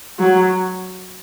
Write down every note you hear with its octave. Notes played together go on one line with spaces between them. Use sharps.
F#3